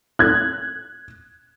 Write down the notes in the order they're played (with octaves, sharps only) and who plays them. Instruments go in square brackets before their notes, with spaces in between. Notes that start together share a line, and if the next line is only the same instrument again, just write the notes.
[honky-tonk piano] F#6 G#6